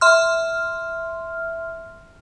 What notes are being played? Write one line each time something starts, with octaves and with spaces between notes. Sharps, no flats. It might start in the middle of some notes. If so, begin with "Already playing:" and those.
E5 C6 F6